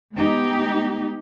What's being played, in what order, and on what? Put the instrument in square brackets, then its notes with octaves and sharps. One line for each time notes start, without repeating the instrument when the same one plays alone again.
[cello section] G#3 B3 D#4 G4